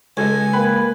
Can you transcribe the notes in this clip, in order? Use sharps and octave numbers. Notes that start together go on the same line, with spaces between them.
C#2 F#4 A4 D#5 G#5
A#3 B4 G5